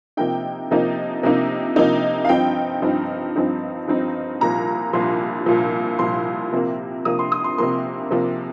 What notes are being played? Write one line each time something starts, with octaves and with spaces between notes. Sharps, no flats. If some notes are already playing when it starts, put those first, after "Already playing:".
C3 F3 A#3 D#4 G5
C3 F3 A#3 D#4
C3 F3 A#3 D#4
C3 F3 A#3 D#4
F5
G2 F3 C4 D#4 G5
G2 F3 C4 D#4
G2 F3 C4 D#4
G2 F3 C4 D#4
C2 A#2 F3 A#5
C2 A#2 F3 C6
C2 A#2 F3
C2 A#2 F3 C6
C3 F3 A#3
C3 F3 A#3 D#6
C6
D#6
C6
C3 F3 A#3 C6
C3 F3 A#3